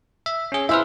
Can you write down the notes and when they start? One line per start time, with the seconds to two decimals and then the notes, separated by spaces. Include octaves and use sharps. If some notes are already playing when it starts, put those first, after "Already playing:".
0.26 E5
0.52 C#4 G#4
0.69 E4 B4 C5 E5 E6 F6